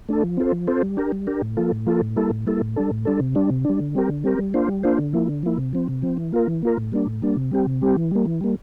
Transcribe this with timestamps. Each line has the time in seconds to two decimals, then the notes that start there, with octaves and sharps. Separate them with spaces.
0.09 A3 D4 A4
0.23 F3
0.37 C4 F4 A4 C5
0.52 F3
0.67 C4 F4 A4 C5
0.82 G3
0.97 D4 G4 A#4
1.12 G3
1.27 D4 G4 A#4
1.42 A2
1.57 F3 A#3 F4 A4
1.72 A2
1.87 F3 A#3 F4 A4
2.01 A2
2.16 G3 A#3 E4 A4
2.30 A2
2.47 G3 A#3 E4 A4
2.61 A2
2.76 G3 D4 A4
2.91 A2
3.05 G3 D4 A4
3.20 C3
3.35 G3 D4
3.50 C3
3.65 G3 D4
3.80 D3
3.95 G3 C4 G4 A#4
4.09 D3
4.24 G3 C4 G4 A#4
4.39 G3
4.54 A#3 D4 F4 C5
4.68 G3
4.83 A#3 D4 F4 C5
4.99 D3
5.13 F3 A#3 E4
5.28 D3
5.43 F3 A#3 E4
5.58 C3
5.73 F3 C4
5.88 C3
6.02 F3 C4
6.17 E3
6.32 A#3 F4 A#4
6.47 E3
6.62 A#3 F4 A#4
6.77 A2
6.92 G3 A#3 D4
7.06 A2
7.22 G3 A#3 D4
7.36 C3
7.51 G3 C4 G4
7.66 C3
7.81 G3 C4 G4
7.96 E3
8.11 G3 A#3
8.25 E3
8.41 G3 A#3